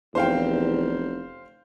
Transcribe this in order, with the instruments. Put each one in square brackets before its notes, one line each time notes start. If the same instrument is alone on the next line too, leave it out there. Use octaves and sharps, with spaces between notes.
[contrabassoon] F1 [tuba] E2 [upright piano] C5 F5 G5